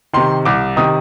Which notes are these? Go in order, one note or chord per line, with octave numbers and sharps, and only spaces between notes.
C3 D#3 C6
C2 D6
C3 D#3 D#6